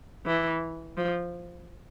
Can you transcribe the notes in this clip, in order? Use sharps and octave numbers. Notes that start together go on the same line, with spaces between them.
E3
F3